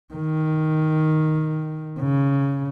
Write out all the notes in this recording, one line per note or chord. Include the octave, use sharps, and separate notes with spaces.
D#3
C#3